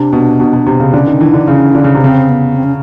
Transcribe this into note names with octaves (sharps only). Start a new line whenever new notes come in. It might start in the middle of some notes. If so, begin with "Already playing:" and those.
Already playing: C3 D4
B2
B2
B2
C3
C#3
D3 C#4
D#3
E3 D4
D3
C#3 C#4
D3
C#3
C3
C#3 C4
B3
C4
C#4